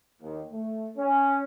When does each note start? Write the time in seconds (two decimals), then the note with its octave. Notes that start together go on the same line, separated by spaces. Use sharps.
0.21 D#2
0.52 A3
0.97 C#4